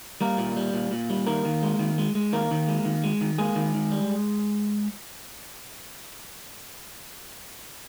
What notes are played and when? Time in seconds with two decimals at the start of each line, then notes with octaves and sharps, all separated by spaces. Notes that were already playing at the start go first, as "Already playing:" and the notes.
0.21 G3 A#3 A#4
0.38 A#2
0.56 G3
0.74 A#2
0.91 A#2
1.10 G3
1.27 D#3 A#3 A#4
1.45 D#3
1.63 G#3
1.79 D#3
1.98 G#3
2.15 G#3
2.33 D#3 A#3 A#4
2.51 D#3
2.68 G#3
2.85 D#3
3.04 G#3
3.21 D#3
3.38 G#3 A#3 G#4
3.56 D#3
3.75 D#3
3.92 G3